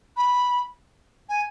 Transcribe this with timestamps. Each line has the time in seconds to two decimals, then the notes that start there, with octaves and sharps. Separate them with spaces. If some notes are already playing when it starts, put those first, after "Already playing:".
0.17 B5
1.29 G#5